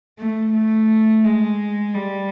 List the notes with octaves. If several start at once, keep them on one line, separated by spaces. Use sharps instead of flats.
A3
A3
G#3
G3